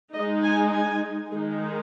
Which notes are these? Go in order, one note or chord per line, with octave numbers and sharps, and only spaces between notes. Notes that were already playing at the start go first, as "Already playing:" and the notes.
G#3 D#4 D#5
G#5
G#5
D#3 G#3 D#4 G#4